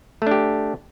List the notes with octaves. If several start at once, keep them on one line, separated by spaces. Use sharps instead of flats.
A3 D4 G4